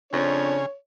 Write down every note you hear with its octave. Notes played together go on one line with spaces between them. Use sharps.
F2 C#3 D4 G#4 C#5